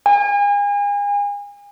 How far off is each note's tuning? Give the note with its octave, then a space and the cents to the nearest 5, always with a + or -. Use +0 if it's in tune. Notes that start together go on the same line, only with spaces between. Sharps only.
G#5 -35